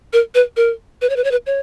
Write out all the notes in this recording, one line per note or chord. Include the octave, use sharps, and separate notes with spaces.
A#4
B4
A#4
B4
C#5
B4
C#5
B4
C#5